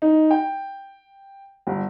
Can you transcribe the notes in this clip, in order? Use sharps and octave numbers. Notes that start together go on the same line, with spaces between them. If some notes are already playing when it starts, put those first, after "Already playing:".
D#4
G5
G1